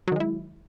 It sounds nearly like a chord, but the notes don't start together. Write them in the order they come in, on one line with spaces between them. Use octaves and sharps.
F#3 D#3 G#3 E4